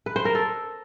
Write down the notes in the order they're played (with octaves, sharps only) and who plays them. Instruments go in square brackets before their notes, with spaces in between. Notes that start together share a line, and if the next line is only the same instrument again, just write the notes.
[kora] B4
C5
A#4
A4